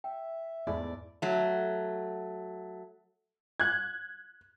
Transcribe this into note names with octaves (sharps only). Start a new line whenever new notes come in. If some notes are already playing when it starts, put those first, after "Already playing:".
E5 G5
E2 G#2 A3 E4 G#4 D5
F#3 A3
F#6 G#6